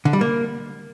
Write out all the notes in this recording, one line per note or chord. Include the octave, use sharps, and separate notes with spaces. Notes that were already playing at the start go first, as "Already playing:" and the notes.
D3
G3
A#3